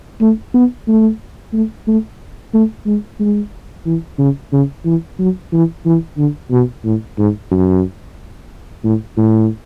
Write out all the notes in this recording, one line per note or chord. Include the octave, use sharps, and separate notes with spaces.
A3
B3
A3
A3
A3
A3
G#3
G#3
E3
C#3
C#3
E3
F#3
E3
E3
D3
B2
A2
G#2
F#2
A2
A2